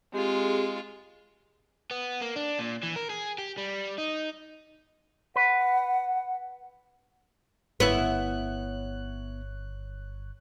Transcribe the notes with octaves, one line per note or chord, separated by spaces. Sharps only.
G#3 C4 F4 G4 G#4
B3
A#3
D4
A#2
E3
A#4
G#4
G4
G3
D#4
B4 F#5
G1 B3 E4 C#5 F#6